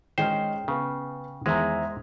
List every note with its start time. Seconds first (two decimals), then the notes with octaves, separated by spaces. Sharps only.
0.18 D#3 G#3 C#4 C5 G5 F6
0.68 C#3 B3
1.46 E2 D#3 E3 G#3 C5 E5 A#5